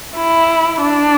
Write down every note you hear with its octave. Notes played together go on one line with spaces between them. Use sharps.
E4
D4